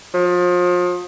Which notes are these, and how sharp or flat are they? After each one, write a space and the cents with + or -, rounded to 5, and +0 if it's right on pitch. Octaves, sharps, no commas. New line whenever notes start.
F3 +35